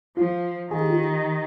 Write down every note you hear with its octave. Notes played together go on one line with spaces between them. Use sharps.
F3 F4
D#3 G#4
G4
F4
G4